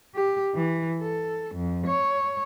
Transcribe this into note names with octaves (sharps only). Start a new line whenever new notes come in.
G4
E3
A4
F2
C#5